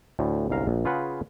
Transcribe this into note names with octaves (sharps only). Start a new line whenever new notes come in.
D2 A2
G1 C2 G#2 F5 A#5
A#1
C#3 F4 G#4 B4 F#5